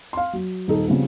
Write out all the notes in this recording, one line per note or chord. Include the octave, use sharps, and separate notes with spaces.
F5 C6
F#3
D#1 D#4 A4
C#3 F3 G3 B3 C4